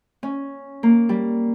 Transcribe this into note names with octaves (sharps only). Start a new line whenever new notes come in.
C#4
A#3
G3